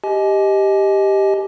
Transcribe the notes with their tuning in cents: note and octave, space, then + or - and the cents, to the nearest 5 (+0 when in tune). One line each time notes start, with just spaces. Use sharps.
G4 +0 D#5 +10 G#5 +35